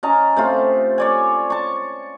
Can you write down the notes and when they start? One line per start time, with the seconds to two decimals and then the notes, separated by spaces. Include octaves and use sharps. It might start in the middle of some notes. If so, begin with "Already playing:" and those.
0.03 C#4 D#5 A5 A#5
0.37 C3 A3 F4
0.98 C#5 D5 G#5
1.50 A5 C#6